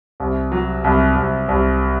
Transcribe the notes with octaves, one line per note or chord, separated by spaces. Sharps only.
C2
F#3
C2
C2
C2